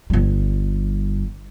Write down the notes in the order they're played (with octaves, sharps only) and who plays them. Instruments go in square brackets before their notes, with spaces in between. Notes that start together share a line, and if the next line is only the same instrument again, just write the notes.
[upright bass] G1 G3